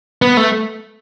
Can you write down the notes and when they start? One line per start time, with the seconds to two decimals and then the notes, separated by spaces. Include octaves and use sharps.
0.22 B3
0.37 A3